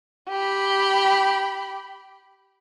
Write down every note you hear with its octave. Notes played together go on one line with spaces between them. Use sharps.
G4 B5